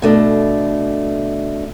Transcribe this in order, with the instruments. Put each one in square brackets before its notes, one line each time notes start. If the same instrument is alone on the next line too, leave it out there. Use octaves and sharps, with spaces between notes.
[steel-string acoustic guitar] B2 A3 D4